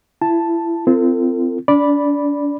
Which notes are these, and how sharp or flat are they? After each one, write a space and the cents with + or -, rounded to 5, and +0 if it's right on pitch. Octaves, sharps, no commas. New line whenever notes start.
E4 +30 A5 +0
C4 -20 F4 -35 A4 +40
D4 -40 D5 -5 B5 -5